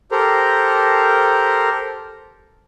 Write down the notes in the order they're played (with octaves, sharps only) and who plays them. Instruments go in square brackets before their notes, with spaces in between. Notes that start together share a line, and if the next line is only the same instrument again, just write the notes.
[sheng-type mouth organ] G4 A4 A#4 C5 A#5